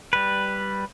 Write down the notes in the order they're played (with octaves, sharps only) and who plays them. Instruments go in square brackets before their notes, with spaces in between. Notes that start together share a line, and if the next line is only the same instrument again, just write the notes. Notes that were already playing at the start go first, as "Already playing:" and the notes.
[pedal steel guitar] G3 B4